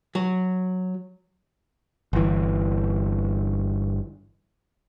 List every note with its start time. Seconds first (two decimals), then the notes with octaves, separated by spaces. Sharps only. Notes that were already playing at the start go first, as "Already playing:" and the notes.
0.15 F#3
2.13 G1 E3